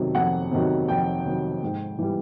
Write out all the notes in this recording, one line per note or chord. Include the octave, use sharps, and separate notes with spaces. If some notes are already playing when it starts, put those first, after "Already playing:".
Already playing: F2 C3 D#3 F#3
F2 F#5
C3 D#3 F#3
F2 G5
C3 D#3 F#3
G#2
E3 G3